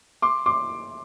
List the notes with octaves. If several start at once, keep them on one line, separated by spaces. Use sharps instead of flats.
C6 D6
C6 D6